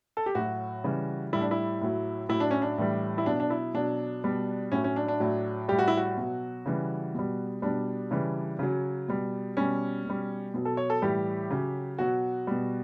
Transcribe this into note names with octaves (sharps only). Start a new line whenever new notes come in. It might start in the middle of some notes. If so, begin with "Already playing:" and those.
A4
G4
A2 F#3 F#4
C#3 E3 G3
A2 G3 E4
D4
E4
A2 F#3
A2 F#3 E4
D4
C#4
D4
A2 E3 G3
E4
B2 F#3 D4
D4
E4
B2 F#3 D4
B2 G3
A2 F#3 C#4
C#4
D4
D4
A2 F#3
A2 G3 G4
F#4
E4
F#4
B2 F#3
C#3 E3 G3
B2 G3
B2 G3 D4
C#3 E3 G3
C#3 F#3
B2 G3
B2 G3 C#4
B2 G3
B2 F#3
A4
C#5
A4
A2 E3 G3 G4
C#3 F#3
B2 F#3 F#4
B2 G3